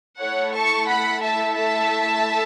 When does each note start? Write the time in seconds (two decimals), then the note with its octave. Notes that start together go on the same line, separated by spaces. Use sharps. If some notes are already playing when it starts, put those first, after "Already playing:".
0.20 A3 E4 A4 C#5 F#5
0.55 A5 C#6
0.88 F#5 B5
1.21 E5 A5
1.55 E5 A5